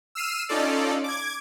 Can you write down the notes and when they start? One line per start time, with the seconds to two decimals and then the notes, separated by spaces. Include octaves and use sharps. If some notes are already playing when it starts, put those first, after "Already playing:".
0.15 E6 F6 C7 D#7 E7
0.49 C#4 D#4 F4 A4 D5
1.04 D6 G#6